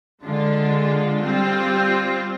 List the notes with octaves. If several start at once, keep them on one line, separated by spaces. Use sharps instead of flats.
D3 G#3 D4 F4
G3 C4 F4